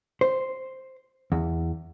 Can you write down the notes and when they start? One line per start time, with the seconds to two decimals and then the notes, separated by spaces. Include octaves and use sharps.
0.21 C5
1.32 E2